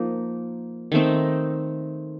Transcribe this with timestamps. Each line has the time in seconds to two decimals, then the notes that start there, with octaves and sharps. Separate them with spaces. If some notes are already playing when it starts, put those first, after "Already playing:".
Already playing: F3 A#3 D#4
0.92 D#3 A3 C4 D#4